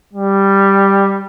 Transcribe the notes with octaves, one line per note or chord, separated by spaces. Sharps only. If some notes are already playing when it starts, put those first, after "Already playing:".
G3